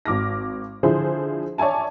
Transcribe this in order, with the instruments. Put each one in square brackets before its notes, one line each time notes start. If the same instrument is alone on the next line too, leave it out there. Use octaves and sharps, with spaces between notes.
[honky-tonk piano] G#1 D6 F6 A#6
D3 F3 E4 G#4 C5
C#5 D5 E5 G#5 A5